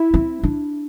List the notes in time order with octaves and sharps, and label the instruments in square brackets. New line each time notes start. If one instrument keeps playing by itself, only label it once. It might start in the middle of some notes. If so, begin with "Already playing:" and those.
Already playing: [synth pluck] E4
[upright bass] C4
D4